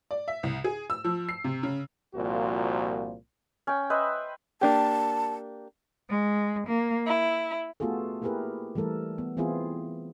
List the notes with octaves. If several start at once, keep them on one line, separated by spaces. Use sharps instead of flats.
D5
E5
C2
G#4
E6
F3
C7
C3
C#3
C2 A#2 F3 A#3 F#4
C#4 G5
B4 C5 D#5 E5
A#3 D4 G4 A5
G#3
A#3
E4
A3 B3 F4 F#4 G#4 A4
A#3 E4 G4 G#4 A#4 B4
E3 G3 A3 A4 A#4
B3
E3 B3 C4 E4 F4 G#4